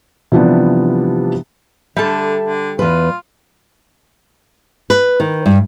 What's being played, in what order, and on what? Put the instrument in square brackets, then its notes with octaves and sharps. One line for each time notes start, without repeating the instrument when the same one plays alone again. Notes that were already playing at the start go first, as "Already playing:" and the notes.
[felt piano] C3 E3 F3 G3 B3 D4
[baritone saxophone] D3 [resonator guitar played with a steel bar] G3 A4 [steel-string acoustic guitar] E5 A5
[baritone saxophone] D3
[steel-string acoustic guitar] E2 B4 [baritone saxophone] F4
[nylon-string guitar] B4
D#3
G2